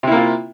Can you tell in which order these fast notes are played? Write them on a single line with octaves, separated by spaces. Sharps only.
C3 E4 A#3 F4